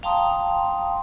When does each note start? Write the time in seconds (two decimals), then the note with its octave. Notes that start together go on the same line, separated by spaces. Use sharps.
0.03 F5 G5 A5 A#5 C6 D#6